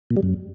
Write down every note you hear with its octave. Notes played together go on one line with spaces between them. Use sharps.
A#2
G3
F#2